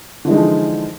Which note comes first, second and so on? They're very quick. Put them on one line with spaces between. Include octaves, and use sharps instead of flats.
D3 E3 G#3 D#4 F3